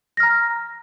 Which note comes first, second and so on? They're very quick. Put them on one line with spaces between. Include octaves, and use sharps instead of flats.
A#6 F6 A#5